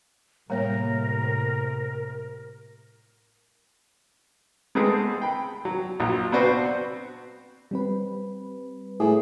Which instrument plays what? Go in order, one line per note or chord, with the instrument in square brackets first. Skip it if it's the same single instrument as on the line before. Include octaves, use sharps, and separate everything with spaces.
[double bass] A2 C3 [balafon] G3 A#3 [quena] A#4 [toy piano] C#5 F5 A#5
[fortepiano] G#3 A3 B3 C4 G#4
G5 B5
F#3
A#1 F#3
B3 C4 D4 F#4 B4 C5
[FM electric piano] G3 C4 B4
[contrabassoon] A2 [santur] G#4